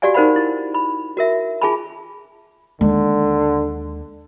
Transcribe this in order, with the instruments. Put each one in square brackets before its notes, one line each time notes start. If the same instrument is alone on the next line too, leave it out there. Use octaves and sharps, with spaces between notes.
[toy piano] F#4 G4 D5 F5 G#5
D#4 A#4 C5 F5 F#5 B5
E4
B5
F#4 A#4 E5
F4 G#4 G#5 A5 B5
[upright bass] D#2 G#3 [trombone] D3